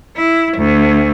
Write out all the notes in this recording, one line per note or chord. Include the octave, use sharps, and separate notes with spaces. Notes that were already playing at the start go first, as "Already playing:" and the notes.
E4
D2